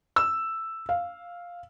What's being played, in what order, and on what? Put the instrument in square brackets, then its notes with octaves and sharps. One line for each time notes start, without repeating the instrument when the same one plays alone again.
[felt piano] E6
F5